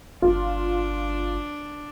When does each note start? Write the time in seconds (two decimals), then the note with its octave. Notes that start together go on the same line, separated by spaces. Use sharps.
0.22 G1 D4 F4